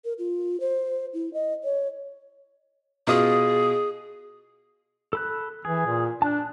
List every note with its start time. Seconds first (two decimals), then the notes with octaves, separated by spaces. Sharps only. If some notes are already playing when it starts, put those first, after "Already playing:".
0.05 A#4
0.19 F4
0.60 C5
1.14 E4
1.34 D#5
1.64 C#5
3.07 B2 F4 G#4 D#6
5.13 A4 B5 F#6
5.65 E3 G#4
5.87 A#2
6.22 D4 A5 F#6